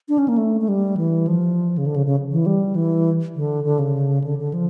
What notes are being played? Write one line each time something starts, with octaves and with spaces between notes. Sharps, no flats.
D4
C#4
A#3
A3
A3
G3
E3
F3
C#3
D3
C#3
C#3
E3
G3
E3
D3
D3
C#3
D3
D3
F3